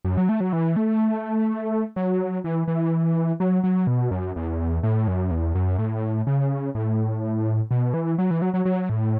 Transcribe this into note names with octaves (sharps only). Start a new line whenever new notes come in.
F#2
F#3
A3
F#3
E3
A3
F#3
E3
E3
F#3
F#3
B2
F#2
E2
A2
F#2
E2
F#2
A2
C#3
A2
B2
E3
F#3
E3
F#3
F#3
F#3
A2